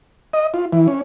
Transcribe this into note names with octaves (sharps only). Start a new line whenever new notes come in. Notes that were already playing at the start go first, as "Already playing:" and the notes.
D#5
F4
E3
C#4